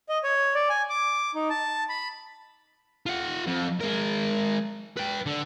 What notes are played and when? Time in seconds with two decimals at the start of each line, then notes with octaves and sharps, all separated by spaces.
0.09 D#5
0.24 C#5
0.55 D5
0.69 G#5
0.89 D6
1.35 D#4
1.50 A5
1.89 B5
3.06 F4 F#5
3.47 F2
3.80 G#3 A#4
4.97 B4 G5
5.26 D3